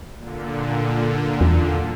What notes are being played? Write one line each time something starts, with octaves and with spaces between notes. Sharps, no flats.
A#2 D3
E2